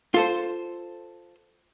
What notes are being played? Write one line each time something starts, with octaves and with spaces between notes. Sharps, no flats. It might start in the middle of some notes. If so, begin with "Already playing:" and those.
F4 A4 C5